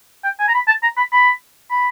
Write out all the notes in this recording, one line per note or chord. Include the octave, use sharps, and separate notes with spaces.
G5
G#5
A#5
B5
A5
A#5
B5
B5
B5